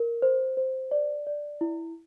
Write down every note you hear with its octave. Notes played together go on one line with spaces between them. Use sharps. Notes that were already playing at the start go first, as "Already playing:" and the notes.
Already playing: A#4
C5
C5
D5
D5
E4